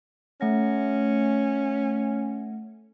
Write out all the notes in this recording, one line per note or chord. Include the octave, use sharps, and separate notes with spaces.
A3 C#4 F#5 A#6